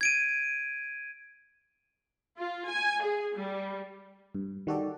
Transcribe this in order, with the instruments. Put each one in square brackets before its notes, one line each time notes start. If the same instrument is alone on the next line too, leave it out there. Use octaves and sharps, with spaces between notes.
[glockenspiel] G#6 D7 D#7
[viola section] F4
G#5
G#4
G3
[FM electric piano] G2
D#3 G3 F#4 G4 A4 D5